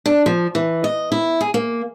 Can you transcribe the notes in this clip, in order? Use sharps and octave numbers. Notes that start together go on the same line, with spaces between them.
D4
F3
E3
D#5
E4
G#4
A#3